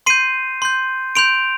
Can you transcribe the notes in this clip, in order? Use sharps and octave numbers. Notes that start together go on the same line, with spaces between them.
C6 G6 C7 D#7
C6 G6
C6 G6 D7 F7